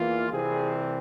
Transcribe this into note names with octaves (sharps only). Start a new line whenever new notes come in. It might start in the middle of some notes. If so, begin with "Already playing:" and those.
Already playing: E2 E3 A#3 F4
C2 C3 E3 G3 C4 G#4